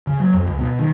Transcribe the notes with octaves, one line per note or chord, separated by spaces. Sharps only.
C#3
F#3
F2
C#2
B2
D#3